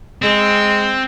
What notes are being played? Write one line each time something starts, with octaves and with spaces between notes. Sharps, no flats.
G#3 C4